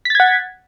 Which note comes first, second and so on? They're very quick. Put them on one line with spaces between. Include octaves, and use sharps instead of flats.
B6 A6 G#6 F#5